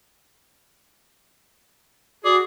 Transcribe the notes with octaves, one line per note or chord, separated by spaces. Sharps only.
F#4 G#4 D5